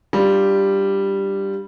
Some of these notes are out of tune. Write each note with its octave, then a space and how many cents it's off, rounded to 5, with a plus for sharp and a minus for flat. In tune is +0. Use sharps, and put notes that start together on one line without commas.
G3 +0 D4 +0 F4 +0